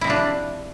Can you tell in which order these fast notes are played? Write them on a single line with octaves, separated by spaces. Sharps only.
E4 C3 F3 D4